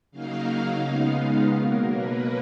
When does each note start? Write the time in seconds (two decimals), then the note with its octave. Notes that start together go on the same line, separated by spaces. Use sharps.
0.11 C#3 F#3 A#3 D#4 F5
0.83 C#3 G#3 B3 D#4 F5
1.20 F5
1.56 B2 F#3 A#3 A#4
1.92 B4